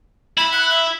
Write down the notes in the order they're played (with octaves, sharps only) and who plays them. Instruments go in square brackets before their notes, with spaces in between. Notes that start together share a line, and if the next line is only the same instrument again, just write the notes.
[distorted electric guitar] E4 [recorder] B5
[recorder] F#6
E5